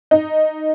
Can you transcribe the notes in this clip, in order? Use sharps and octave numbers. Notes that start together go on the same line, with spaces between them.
D#4